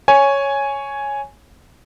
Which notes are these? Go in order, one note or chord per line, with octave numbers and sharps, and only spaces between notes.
C#5 G#5